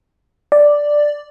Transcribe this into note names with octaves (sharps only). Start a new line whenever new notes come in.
D5